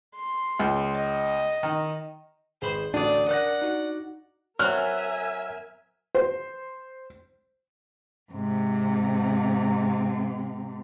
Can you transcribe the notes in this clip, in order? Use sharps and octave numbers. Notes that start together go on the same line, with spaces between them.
C6
C#2
D#5
D#3
G#1 G#4 B4 C5 B5 F#7
A1 D2 A2 D4 F#4 A4 D5 D#6
A#4 D5 F#5 F#6 A#6
D#4 F#4
F#3 B3 C4 A#4 E5 G#5 F6 F#6
C5
G#2 C3